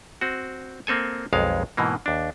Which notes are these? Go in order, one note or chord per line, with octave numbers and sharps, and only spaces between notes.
C4 F#4
A#3 C4 A4 G#5
B1 F2 G#3 F5
G#2 B2 E3 A#3
D#2 D4